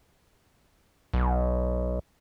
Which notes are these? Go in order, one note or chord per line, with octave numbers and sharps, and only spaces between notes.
B1